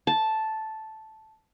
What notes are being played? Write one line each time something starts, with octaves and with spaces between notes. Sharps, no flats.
A5